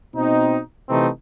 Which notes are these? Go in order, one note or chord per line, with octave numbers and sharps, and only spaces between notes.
B2 C4 D#4
C3 E3 A3 C4 D#4